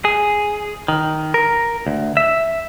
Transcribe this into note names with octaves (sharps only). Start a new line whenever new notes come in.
G#4
D#3
A#4
D2
E5